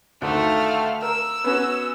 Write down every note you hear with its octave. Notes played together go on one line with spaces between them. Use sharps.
D2 D#3 A3 F5
A#4 E6
B3 C#4 F#4